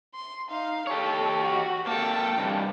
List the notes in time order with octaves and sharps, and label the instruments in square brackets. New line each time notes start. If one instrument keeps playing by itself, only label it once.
[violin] C6
D#4 F5
[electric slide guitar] G4 C#5 [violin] A4
[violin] F#4
[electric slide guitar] A#3 A4 [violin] G5 A5
[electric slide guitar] G2 C3